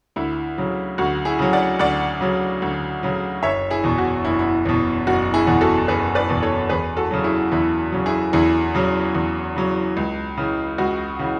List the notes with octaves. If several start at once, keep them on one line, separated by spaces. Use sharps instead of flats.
D2 E4
C#3 F#3
D2 F#4
E4 G#4
C#3 F#3
D5 F#5
D2 D5 F#5
C#3 F#3
D2
C#3 F#3
F#1 C#5 E5
E4 G#4
E2 B2
F#4
F#1 E4
E4
E2 B2
F#1 F#4
E4 G#4
E2 B2
F#4 A4
F#1 G#4 B4
B4 D5
E2 B2
A4 C#5
E2 G#4 B4
F#4 A4
C#3 F#3
E4 G#4
E2 E4
C#3 F#3
E4 G#4
E2 E4 G#4
C#3 F#3
E2
C#3 F#3
C#2
C#3 E3
C#2 F#4
C#3 E3